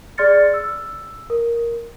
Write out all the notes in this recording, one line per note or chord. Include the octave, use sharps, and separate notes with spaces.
G#4 D5 C6 F6 A6 C#7
E6
A#4